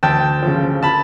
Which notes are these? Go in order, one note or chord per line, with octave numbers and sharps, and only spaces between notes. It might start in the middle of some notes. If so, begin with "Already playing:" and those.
D2 G5 A5
F3
C#3
A5 B5